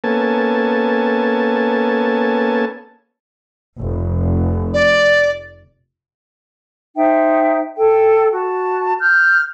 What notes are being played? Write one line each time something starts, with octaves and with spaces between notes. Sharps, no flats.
A#3 B3 C#4 A4 G#5 A5
F1
D5
D#4 C5 E5 G5
A4 G5
F#4 A5
F6 G6